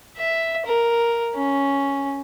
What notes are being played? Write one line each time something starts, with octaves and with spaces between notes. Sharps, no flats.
E5
A#4
C#4